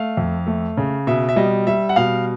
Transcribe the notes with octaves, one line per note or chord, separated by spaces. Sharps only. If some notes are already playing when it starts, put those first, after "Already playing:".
Already playing: A3 F5
F2
A3
C#3
B2 E5
E5
G3 D#5
G3 E5
F#5
B2 F5